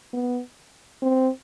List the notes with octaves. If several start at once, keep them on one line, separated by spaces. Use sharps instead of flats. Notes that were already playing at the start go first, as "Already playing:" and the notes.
B3
C4